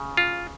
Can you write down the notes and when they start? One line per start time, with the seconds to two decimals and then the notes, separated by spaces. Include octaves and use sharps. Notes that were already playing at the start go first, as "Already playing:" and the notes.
Already playing: C#3
0.17 F4